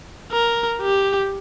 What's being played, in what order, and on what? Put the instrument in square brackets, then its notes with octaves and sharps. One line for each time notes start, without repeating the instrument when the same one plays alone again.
[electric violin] A#4
G4